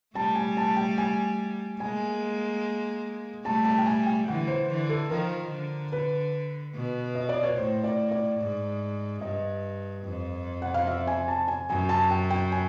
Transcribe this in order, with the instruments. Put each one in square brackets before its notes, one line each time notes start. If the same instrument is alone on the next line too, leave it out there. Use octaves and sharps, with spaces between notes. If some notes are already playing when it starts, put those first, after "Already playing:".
[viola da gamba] G3 A3 [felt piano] A5
[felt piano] G#5
A5
G5
G#5
[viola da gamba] G#3 A#3 [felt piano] G#5
[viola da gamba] G3 A3 [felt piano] A5
[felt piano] A5
G5
G#5
G5
[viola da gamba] D3 E3 [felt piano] F#5
[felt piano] C5
[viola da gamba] D3 E3
[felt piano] A4
[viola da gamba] D#3 F3 [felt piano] A#4
[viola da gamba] D3
[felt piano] B4
[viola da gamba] B2
[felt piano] D#5
D5
C#5
[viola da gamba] A2 [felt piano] C5
[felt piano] D5
D5
[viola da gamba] G#2
[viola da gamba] G2 [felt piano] D#5
[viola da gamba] F2
[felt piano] F#5
F5
E5
G#5
A5
G#5
[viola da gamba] F#2 [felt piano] G#5
[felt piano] A5
G5
G5
G#5